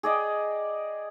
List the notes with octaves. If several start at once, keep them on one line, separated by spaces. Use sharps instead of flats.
G#4 D5 D#5 G5